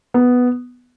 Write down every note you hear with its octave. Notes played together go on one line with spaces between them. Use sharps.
B3